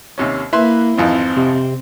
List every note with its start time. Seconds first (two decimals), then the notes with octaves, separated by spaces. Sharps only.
0.18 D#2 C3 C#4
0.53 A#3 E4 B4 E5 C6
0.98 G#1 F2 E3 C4
1.37 C3